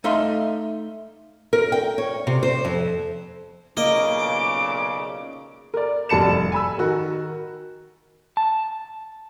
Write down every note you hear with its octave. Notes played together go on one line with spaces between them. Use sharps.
A3 D#4 E5 F5 C6
A#4
G5
C#5
C3
C5
F2
B1 A#2 C#3 A#3 D#5 D6
A#4 D5
F1 G3 A5 C#7 E7
G#5 B5 E6
D#3 F#4 A#4
A5